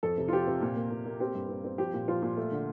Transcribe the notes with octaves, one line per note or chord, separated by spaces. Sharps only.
F2 A4
C3
F4
F3 G4
C3
A#2
A#3
A#2
A#3
C4 G4
G2
C4
C4
F3 G4
A#2
F3 F4
A#2
A3
D3